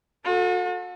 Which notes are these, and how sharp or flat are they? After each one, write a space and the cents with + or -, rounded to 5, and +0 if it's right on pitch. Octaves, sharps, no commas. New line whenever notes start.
F#4 -45 A4 +5